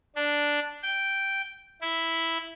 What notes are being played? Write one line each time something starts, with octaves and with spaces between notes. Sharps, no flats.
D4
G5
E4